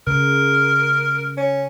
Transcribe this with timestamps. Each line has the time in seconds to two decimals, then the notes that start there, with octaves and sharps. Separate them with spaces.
0.07 C#3 A#4
1.37 C#4